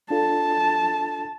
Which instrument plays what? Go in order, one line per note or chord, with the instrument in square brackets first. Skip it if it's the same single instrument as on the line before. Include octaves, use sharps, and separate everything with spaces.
[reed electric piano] D4 F4 A4 [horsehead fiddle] A5